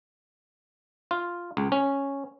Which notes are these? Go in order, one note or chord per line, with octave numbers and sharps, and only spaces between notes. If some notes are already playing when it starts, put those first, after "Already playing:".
F4
C#2
C#4